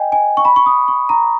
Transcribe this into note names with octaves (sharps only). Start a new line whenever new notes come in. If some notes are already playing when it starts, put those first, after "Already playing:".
Already playing: D#5 G5 G#5
G#5
C#6
B5
C#6
D#6
C#6
A#5